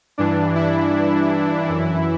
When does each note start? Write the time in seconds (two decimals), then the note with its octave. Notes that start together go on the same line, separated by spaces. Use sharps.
0.18 G2 E3 D4
0.55 E4
1.65 F#2 E3